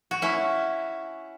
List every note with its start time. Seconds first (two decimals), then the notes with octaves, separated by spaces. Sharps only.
0.11 F#4
0.22 C#4 E4